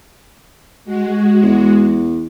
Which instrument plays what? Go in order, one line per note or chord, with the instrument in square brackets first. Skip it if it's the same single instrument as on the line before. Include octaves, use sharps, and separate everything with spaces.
[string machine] G#3 F#4
[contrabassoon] E2